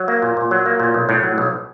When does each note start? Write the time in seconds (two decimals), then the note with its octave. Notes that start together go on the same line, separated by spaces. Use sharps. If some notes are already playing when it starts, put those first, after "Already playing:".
Already playing: F#3
0.08 A#3
0.22 A#2
0.37 A#2
0.51 F#3
0.66 A#3
0.80 A#2
0.94 B1
1.09 A2
1.23 F#3
1.38 B1